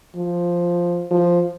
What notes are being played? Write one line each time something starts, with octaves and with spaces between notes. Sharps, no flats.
F3
F3